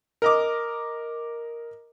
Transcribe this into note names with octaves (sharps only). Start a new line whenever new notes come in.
A#4 D#5 D6